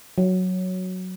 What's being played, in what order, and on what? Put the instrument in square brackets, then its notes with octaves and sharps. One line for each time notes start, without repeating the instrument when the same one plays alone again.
[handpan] F#3